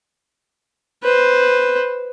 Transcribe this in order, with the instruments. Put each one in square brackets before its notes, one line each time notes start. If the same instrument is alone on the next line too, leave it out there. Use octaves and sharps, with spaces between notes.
[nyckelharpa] B4 C5